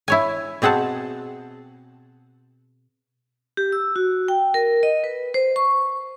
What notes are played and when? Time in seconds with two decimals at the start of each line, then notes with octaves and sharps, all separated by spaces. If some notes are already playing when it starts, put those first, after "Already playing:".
0.08 E4 C#5 G#5
0.62 B2 C4 G#4 F#5 A5
3.57 G4
3.72 E6
3.96 F#4
4.28 G5
4.54 A#4
4.83 D#5
5.04 B4
5.34 C5
5.56 C#6